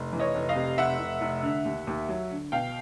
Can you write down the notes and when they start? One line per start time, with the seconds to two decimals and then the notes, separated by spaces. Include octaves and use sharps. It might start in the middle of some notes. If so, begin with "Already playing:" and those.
Already playing: F1
0.13 E3
0.20 C#5 D#5
0.35 F1
0.49 D#5 F5
0.55 C3
0.78 F1 E5 F#5
1.00 F1
1.21 F1
1.43 D3
1.65 D#2
1.87 D#2
2.09 F#3
2.31 D3
2.52 B2 F5 G5